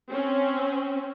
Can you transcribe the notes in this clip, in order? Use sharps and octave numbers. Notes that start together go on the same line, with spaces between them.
C4 C#4